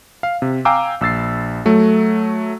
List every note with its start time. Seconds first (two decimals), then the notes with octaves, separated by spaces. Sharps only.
0.23 F5
0.42 C3
0.65 F5 G5 G#5 A#5 D6 E6
1.01 A#1 E6 A6 C7
1.65 F#3 A3